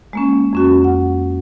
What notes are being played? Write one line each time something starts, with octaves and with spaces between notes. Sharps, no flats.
G#3 A#3 C#4
F2 C#4 F#4
F#5